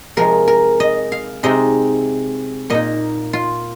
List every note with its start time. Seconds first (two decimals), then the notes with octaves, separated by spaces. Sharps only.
0.17 C3 F3 G#3 A#4
0.48 A#4
0.80 D#5
1.12 F5
1.43 C3 G#3 C4 D#4 D#5
2.70 A#2 A#3 D#4 D#5
3.33 F4